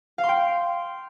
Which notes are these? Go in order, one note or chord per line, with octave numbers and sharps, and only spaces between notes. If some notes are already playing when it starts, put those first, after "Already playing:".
F5
C6
G5